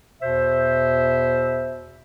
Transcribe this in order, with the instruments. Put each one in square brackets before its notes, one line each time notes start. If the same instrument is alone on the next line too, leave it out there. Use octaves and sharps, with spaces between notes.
[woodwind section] E2 B2 C5 E5